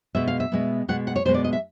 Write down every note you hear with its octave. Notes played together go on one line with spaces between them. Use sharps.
B2 G#3 B3 E5
F5
E5
B2 G#3 B3
B2 G#3 B3 F#5
F#5
C#5
B2 G#3 B3 C5
D5
D#5
E5